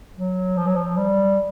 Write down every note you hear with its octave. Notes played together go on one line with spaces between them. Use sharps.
F#3
F3
F#3
F3
G3